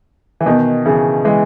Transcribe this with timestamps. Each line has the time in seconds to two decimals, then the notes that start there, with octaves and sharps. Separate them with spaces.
0.41 E3
0.46 B2 D#3
0.86 C#3 E3
1.25 E3 G#3